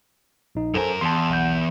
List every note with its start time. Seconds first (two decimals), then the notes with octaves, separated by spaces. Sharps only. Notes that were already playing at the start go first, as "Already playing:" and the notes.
0.55 A#1 D#4
0.74 F#2 A4 A#4 C5 G#5
1.01 E2 A5 C6
1.30 B1 F#5 G6